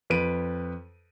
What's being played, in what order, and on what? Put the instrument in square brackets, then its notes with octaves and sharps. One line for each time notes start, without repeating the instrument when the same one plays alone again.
[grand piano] F2 B4 D7 D#7